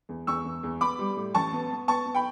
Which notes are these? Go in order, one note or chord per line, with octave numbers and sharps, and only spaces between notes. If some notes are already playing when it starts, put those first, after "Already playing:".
E2
E2 C#6 E6
E2
E2
B3 B5 D6
G3
A2
A1 A5 C#6
B3
B3
B3 A5 C#6
B3
G5 B5